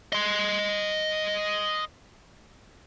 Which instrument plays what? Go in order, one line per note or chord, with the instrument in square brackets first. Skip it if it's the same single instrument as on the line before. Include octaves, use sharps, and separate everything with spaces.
[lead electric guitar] D#5 C6